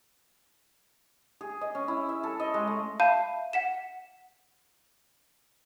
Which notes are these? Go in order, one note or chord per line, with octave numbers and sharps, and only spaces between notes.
G#4
D#5
C#4
E4
E5
A4
D#5
G#3
A3
E5 F5 A5 B5 G6 D#7
F#5 B6 E7